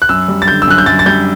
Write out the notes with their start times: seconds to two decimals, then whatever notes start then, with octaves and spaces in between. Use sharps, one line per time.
0.02 F#6
0.09 F#2 E6
0.28 G3
0.42 A6
0.48 D3 G6
0.62 E6
0.67 F#2 F#6
0.78 G6
0.86 F#2 A6
0.99 A6
1.06 G3 G6